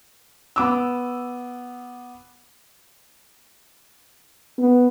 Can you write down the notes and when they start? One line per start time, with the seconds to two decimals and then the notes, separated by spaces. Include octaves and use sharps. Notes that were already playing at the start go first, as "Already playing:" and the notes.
0.56 B3 D6 E6
4.58 B3